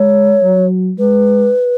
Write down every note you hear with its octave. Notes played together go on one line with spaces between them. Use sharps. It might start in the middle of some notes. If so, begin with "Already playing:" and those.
Already playing: G#3 C#5
F#3
G#3 B4